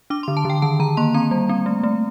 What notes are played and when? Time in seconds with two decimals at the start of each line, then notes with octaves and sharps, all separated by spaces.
0.10 D4 D6
0.23 D3 C6
0.37 A5
0.45 D3 G5
0.62 D#3 A5
0.80 D#3 A#5
0.97 A#3 C6
1.14 C4 A#5
1.31 G3
1.49 C4
1.66 A3
1.83 A3